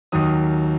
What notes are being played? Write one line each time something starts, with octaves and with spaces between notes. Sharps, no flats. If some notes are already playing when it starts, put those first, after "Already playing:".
D#2 D#3 F#3 D#6